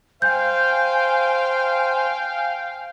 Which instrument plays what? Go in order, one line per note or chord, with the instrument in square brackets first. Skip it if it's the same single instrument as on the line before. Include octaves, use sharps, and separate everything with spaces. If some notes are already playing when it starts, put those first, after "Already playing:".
[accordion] C5 [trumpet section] F5 G5 [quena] G#5 [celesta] G6